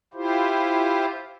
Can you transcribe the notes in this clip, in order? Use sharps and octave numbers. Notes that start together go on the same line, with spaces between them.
E4 F4 G4 C5